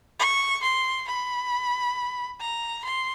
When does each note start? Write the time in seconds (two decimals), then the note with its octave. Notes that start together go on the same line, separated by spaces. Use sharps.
0.19 C#6
0.63 C6
1.08 B5
2.40 A#5
2.84 C6